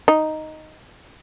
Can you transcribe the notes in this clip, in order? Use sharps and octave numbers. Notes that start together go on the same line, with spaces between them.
D#4